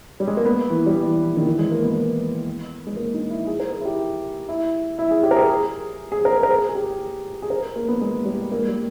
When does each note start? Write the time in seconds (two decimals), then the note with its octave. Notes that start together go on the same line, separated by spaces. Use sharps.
0.20 G3
0.27 G#3
0.37 A#3
0.46 B3
0.70 E3
0.86 G3
0.95 E3
1.21 E3
1.37 D#3
1.47 E3
1.59 G#3
1.72 A#3
1.84 B3
1.92 A#3
1.99 B3
2.87 G#3
2.97 A#3
3.14 D#4
3.30 E4
3.47 G#4
3.60 A#4
3.72 G#4
3.81 E4
3.85 G4
4.48 E4
4.99 E4
5.11 G#4
5.23 G4
5.31 A#4
5.36 G#4
5.49 G#4
6.12 G#4
6.25 A#4
6.43 A#4
6.49 G#4
6.69 G#4
6.75 G4
7.42 G#4
7.50 A#4
7.76 A#3
7.88 B3
8.01 G#3
8.25 G3
8.52 A#3
8.59 G#3
8.68 G3